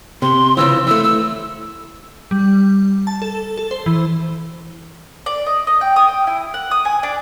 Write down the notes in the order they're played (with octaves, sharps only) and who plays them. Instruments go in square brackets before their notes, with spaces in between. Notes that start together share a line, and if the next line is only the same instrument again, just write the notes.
[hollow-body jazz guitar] C3 [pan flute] C6
[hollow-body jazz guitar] C#3 E3 F3 [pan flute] E6
[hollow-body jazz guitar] E3 A3 [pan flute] E6
[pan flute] E6
[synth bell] G3
A5
A4
A4
C5
E3
[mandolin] D5
D#5
D#5
G5
D#6
G5
E4
F#5
D#6
G#5
D4